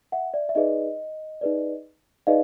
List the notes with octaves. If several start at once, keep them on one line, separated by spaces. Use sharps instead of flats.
E5 F#5
D5 E5
E5
D#4 G#4 B4 D5 D#5
D#4 G#4 B4 D5
D#4 G#4 B4 D5 D#5 F5